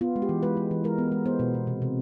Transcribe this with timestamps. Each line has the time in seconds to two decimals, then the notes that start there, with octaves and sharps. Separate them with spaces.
0.01 B3 F4
0.16 G#3
0.22 G4
0.29 E3
0.43 G#3 B4
0.57 G#3
0.71 E3
0.84 G#3 A#4
0.98 B3
1.12 G#3
1.26 B3 C5
1.39 B2
1.55 B2
1.67 C3
1.82 C3